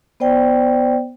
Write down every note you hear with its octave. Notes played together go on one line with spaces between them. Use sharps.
B3 C5 D5 G5